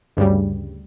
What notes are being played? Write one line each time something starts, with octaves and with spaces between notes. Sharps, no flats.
D2 G2 C#3 G3